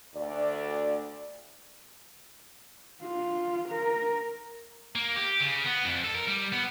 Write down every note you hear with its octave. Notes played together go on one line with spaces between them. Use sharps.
D2 D5
F4
A#4
A#3
G4
C#3
B3
F2
A4
A#4
G3
B3